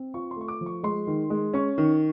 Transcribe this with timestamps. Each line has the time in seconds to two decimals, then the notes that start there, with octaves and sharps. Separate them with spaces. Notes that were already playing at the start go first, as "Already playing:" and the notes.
Already playing: C4
0.14 F4 C#6
0.31 C6
0.36 A3 C#6
0.48 D6
0.61 F3
0.66 C#6
0.83 G#3 C6
1.07 D#3
1.30 G#3
1.54 C#4 C#6
1.78 D#3